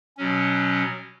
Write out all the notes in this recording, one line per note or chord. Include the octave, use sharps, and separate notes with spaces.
B2 F#3 C#4